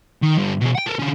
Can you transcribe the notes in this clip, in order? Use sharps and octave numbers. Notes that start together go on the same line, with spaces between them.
D#3
G2 D3
B2 G#4
F#5 G5
A4 A#4
D3 C#4